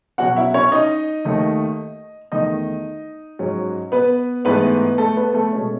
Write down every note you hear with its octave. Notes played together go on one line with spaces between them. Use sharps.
B2 F#3 C#4 F#4 F#5
E4 E5
C#4 C#5
D#4 D#5
D#2 D#3 A3 D#4
E2 D#3 A3 D#4 D#5
G#2 F#3 C#4
B3 B4
G#2 E3 A3 B3 B4
A3 A4
B3 B4
A3 A4
B2 G#3 C#4